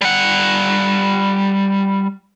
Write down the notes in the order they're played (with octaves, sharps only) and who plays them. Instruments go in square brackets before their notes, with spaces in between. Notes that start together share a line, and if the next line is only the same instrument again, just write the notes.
[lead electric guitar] G3 F#5